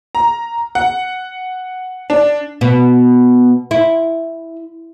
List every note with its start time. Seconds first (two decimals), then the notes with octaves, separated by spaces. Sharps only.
0.15 A#5
0.75 F#5
2.10 D4
2.61 B2
3.71 E4